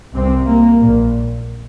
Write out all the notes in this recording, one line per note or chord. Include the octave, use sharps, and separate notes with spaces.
C2 C3 C4
A#3
A#1 A#2